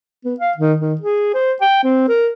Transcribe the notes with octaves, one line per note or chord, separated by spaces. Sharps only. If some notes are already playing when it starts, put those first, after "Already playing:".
B3
F5
D#3
D#3
G#4
C5
G5
C4
A#4